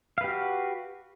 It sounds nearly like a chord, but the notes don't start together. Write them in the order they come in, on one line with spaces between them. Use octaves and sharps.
F5 B4 G4 F#4